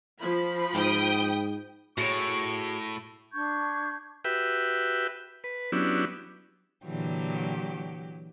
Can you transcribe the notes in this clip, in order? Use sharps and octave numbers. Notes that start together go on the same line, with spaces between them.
F3 B5
G#2 G5 D#6
A2 F#4 G#4 C#5 C#6 D7
D4 C#6 G6 G#6
F#4 G4 B4 E5 G5
B4
F#3 B3 C#4 D4 E4 G4
A#2 D3 E3 F#3 G4